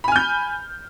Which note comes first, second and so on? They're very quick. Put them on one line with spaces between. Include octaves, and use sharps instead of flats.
B5 G#5 F6 G6